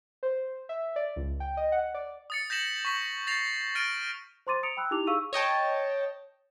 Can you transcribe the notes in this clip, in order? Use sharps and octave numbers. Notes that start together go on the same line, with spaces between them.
C5
E5
D5
C#2
G5
D#5
F#5
D5
D#6 A6 C#7
G6 A#6 B6 E7 F#7
C#6 B6 F#7
A6 A#6 C7 F7
F6 A6 A#6 D7 D#7
C5 A#5 C6 D6 A6 D#7
A#5 D#6 C#7 D7 F7
G5 B5 E6 F#6
D#4 E4 G4 D6 F7
G#4 F5 C#6 E6 D#7
C#5 D#5 G5 A5